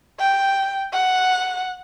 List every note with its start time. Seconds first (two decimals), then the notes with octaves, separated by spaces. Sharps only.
0.19 G5
0.93 F#5